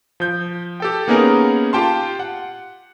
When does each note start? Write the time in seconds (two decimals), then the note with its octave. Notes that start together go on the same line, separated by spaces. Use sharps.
0.20 F3 G6
0.80 G4 A4 G5
1.08 A#3 B3 C#4 D#4 G#4 A#4
1.73 F4 G4 G5 A5 C6
2.19 F#5